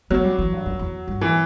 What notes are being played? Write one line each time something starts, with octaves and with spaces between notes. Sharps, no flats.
F#3 B3
G3
E3
G2
F#2
E2
G2
E3